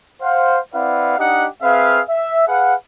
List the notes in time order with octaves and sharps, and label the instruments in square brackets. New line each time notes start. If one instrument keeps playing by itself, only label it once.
[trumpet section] C5 F5 F#5
C4 E4 B4 D5 F5 F#5
D4 D#4 G4 D#5 F#5
C4 G#4 B4 E5 F5
E5
G#4 B4 F5 F#5